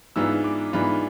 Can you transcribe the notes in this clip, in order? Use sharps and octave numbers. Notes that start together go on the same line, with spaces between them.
G#2 E3 B3 D4 F4 E6
D6
G#2 E3 B3 D4 F4 B5